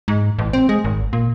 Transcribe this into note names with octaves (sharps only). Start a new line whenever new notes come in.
G#2
A1
C4
G#3
G#1
A#2